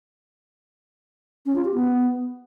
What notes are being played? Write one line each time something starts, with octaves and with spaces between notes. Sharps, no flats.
C#4
F4
G4
B3